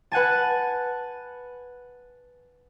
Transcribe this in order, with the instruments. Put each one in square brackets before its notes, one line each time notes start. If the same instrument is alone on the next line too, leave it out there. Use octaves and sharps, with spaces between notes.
[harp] B4 F#5 G#5 A5